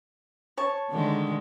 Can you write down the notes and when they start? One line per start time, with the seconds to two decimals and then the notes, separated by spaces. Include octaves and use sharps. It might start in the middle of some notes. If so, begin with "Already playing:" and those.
0.57 C#5 A5
0.90 D3 D#3 G#3